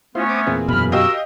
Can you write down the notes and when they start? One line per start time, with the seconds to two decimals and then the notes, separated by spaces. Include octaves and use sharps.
0.15 A3 B3 C#4 E4 F4 C5
0.29 C4 D6 D#6
0.47 E2 A#2 C4 G#4
0.69 F#2 B2 B5 F6
0.92 F#4 G4 A#4 D#5 F5 E6